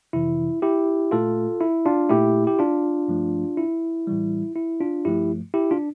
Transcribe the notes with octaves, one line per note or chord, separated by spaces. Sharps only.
F2 C3 E3 E4
E4 G4
A#2 A3 F4 A4
E4
D4 F4
A#2 A3 E4 G4
G4
D4 F4
G2 F3 A3
E4
A2 E3 G3
E4
D4 F4
G2 F3 A3 E4 G4
E4 G4
D4 F4